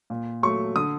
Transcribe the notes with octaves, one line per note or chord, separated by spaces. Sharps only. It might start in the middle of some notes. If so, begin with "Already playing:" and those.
A#2
F#3 A3 C#6
D3 D#6